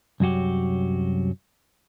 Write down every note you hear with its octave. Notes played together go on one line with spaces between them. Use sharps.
C2 F#2 F#3 F#4 G4